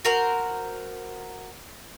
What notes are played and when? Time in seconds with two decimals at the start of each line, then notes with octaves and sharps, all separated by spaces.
0.05 F#4 A#4 C5